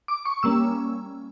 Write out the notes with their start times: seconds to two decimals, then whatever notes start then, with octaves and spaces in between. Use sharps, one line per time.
0.08 D6
0.25 C#6
0.43 G3 A#3 C#4 E6